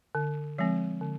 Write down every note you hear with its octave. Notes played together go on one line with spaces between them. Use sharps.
D3
F3 G#3 C4
D3